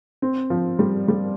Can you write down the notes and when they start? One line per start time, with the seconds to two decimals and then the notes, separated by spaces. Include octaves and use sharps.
0.22 C4
0.50 F3
0.79 G3
1.08 G3